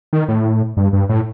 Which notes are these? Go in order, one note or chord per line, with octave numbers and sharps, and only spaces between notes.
D#3
A2
G2
G2
A2